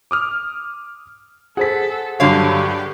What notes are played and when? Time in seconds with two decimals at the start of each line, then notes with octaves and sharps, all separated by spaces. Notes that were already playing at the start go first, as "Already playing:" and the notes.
0.11 D6 D#6 F6
1.57 G#4 A4 C5 F#5 B6
2.20 G2 D3 F#3 G4 C#5 F5